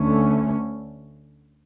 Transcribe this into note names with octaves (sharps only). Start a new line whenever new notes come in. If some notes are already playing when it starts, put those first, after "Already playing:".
Already playing: D2 D3 A3 C#4